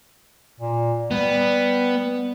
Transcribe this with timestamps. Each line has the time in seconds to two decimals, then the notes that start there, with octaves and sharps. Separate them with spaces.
0.60 A#2
1.11 G3 B3